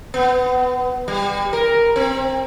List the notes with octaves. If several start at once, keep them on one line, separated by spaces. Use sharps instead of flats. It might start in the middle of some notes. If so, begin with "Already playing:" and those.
B3
G3
A#4
C4